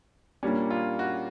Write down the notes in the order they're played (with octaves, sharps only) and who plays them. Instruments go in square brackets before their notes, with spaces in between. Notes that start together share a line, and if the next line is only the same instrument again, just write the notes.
[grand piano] A#2 G3 A#3 D4 [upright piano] C#4
[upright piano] F4
F#4